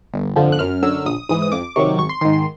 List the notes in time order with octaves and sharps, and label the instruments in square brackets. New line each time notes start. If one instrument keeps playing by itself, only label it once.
[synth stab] G1
F2 D3 F3
F#6
F#2 F6
D3 F#3 E6
A#1 D#6
G#2 E3 D#6
D#6
F2 D6
C3 D#3 F#3 C#6
G#1 C#6
C6
G#2 D#3 C6
C6